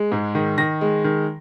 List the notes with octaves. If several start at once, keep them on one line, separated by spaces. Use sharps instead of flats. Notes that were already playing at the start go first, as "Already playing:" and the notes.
Already playing: G#3
G#2
D#3
D#3 A#6
G#3
D#3